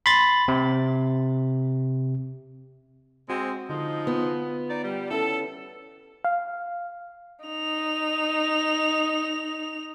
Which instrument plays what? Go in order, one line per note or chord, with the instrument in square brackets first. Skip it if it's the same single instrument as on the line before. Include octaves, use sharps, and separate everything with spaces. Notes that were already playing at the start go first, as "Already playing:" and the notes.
[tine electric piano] B5 C6 A6
C3
[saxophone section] G#3 C4 [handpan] F#4
[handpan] D3 [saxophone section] F3 G#3 D#4
[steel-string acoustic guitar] B3 [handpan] F4
[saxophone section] D#4 D5
G3
[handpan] C#4 E4 [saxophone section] A4
[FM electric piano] F5
[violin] D#4 F7